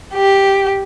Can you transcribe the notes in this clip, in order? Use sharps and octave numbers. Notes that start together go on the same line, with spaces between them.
G4